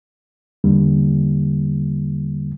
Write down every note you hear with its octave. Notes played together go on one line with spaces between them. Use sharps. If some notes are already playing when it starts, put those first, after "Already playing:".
E2 D3 G3 A#3